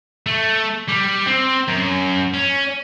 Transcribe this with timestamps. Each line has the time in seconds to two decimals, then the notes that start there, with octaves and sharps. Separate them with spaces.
0.26 A3
0.89 G3
1.28 C4
1.68 F#2
2.34 C#4